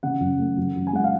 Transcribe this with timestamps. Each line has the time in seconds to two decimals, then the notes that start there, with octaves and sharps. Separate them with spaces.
0.03 C#3 F#5
0.20 F#2
0.39 A3
0.57 F#2
0.76 F#2
0.87 G#5
0.93 G#3 F#5
1.04 F5